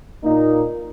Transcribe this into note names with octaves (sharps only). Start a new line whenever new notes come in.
A#2 A#3 D#4